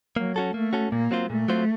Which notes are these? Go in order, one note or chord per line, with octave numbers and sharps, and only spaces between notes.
F#3 A#3
C#4 F#4 A4
A3 A#3
C#4 F#4 A4
A#2 A#3
F#3 C4 F4 C5
A#2 A3
F#3 C4 F4 C5